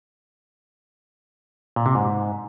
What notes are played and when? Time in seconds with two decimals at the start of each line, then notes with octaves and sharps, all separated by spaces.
1.76 A#2
1.86 C3
1.95 G#2